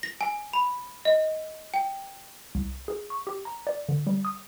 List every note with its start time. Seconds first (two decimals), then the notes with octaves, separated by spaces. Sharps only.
0.03 A#6
0.21 G#5
0.53 B5
1.05 D#5
1.74 G5
2.55 C2
2.88 G#4
3.10 C#6
3.27 G4
3.45 A#5
3.67 D5
3.89 D3
4.07 G3
4.25 D#6